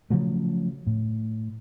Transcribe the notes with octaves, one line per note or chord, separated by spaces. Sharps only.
C#3 F3 F#3 A3
A2